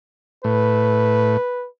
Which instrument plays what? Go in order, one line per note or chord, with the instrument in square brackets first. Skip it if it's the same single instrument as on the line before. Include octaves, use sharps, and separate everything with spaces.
[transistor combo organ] A2 [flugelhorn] B4